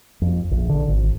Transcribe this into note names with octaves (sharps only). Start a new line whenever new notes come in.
F2
A#1
D3
G#1